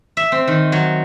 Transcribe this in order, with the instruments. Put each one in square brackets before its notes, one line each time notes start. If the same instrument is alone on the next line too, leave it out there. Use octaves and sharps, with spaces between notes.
[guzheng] E5
C4
D#3
F#3